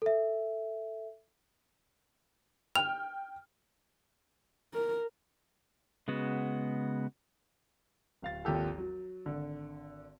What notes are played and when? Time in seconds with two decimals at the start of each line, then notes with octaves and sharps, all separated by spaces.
0.02 A4 E5
2.75 G5 F6 F7
4.74 A#4
6.08 C#3 G#3 B3 F#4
8.22 D1 F5 A6
8.45 G#1 D#2 F3 G4 A4
8.78 F#3
9.26 G#1 D3